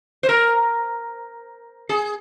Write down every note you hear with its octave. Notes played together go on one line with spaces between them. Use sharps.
C5
A#4
G#4